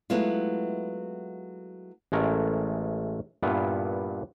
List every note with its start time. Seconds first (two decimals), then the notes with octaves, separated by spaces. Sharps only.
0.10 F#3 G#3 A3 B3 E4 F4
2.12 A1 G#3 A3 A#4
3.43 G2 A#2 B3 E4 F4